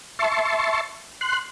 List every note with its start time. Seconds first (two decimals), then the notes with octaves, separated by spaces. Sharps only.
0.19 E5 A5 C6 C#6
1.21 C6 F#6